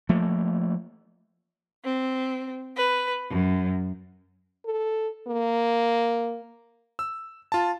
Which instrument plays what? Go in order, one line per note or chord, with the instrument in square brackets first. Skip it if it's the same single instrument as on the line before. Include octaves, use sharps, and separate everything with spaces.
[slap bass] F3 A3 A#3
[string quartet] C4
B4
F#2
[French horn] A4
A#3
[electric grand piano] E6
F4 A5